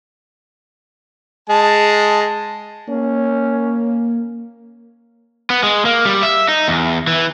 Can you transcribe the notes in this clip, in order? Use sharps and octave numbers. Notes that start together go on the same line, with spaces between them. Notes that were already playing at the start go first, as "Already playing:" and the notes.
G#3 A5
A#3 C#4
B3
G#3
A#3
G3
E5
D#4
E2
E3